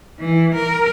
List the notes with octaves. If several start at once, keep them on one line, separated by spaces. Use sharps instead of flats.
E3
A#4